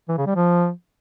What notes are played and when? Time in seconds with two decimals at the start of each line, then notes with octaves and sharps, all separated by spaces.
0.08 E3
0.17 C#3
0.26 G3
0.35 F3